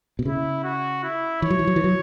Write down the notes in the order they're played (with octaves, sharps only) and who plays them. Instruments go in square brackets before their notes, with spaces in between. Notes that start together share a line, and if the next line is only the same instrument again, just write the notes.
[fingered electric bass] B2
[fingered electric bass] C#3 [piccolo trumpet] E4
[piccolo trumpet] F#4
E4
[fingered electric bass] E3 [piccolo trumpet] C#5
[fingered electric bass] F#3
E3
F#3
E3
F#3